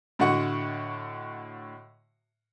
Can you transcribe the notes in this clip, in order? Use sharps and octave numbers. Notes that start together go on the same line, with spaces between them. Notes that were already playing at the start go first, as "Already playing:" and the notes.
A2 D3 F#4 D#5 F#5 C#6